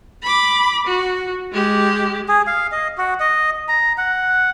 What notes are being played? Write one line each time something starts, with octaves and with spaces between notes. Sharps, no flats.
B5 D6
F#4
G#3 G4
G#4
F5
D#5
F#4
D#5
A#5
F#5